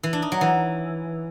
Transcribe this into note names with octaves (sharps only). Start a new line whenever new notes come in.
E3
D4
D#4
F#3
E3